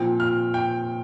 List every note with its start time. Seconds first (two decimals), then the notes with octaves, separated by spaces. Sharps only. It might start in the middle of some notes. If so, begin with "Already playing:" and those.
Already playing: A#2 F3 C4 G5
0.20 F6
0.54 G5